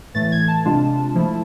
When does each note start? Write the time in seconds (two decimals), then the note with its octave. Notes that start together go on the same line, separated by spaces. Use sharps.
0.14 A2 E3 A3 A6
0.32 G#6
0.48 A5
0.65 C3 G#3 D4 F4
1.15 F3 A3 E4